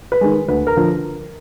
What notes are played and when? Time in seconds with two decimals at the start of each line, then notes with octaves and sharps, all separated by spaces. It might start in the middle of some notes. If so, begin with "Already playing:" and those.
0.12 B4
0.21 D#3 G#3
0.48 D2 B4
0.67 A#4
0.77 D3 F3